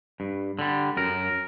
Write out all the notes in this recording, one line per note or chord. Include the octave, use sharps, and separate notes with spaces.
G2
D3 G3
F#2 A#4